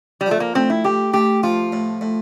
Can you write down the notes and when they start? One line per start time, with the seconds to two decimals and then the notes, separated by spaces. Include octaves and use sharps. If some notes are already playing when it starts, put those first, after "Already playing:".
0.21 G3
0.26 F3 A3
0.40 A#3
0.55 A2 C4
0.70 E4
0.85 A2 G4
1.13 A3 G4
1.43 F3 F4
1.72 A2
2.01 A2